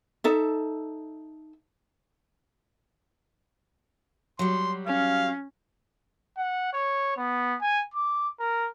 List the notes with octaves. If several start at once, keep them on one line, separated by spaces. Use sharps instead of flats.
D#4 A4 E5
F#3 G3 C6
C#4 F5
F#5
C#5
B3
G#5
D6
A#4